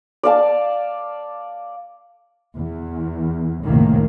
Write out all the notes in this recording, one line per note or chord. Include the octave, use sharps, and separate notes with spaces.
D5 F5 A5
E2
F1 C#2 A2 D#3 A#3